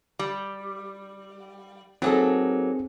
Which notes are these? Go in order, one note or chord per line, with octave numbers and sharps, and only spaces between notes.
G3
F#3 A#3 C4 D#4 G#4 A4